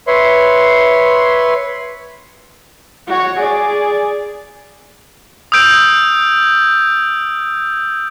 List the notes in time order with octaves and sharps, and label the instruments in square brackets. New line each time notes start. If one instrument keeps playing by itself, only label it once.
[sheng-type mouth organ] B4 C#5 E5 C6
[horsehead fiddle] F#4 C#5
G#4 D5
[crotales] D#6 E6 G6 D7